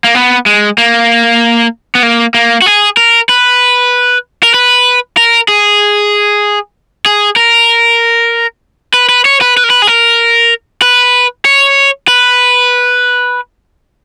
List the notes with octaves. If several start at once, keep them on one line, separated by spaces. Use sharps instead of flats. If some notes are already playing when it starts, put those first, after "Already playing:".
A#3
B3
G#3
A#3
B3
A#3
A#3
F#4
G#4
A#4
B4
A#4
B4
A#4
G#4
G#4
A#4
B4
B4
C#5
B4
B4
A#4
B4
G#4
A#4
B4
C#5
B4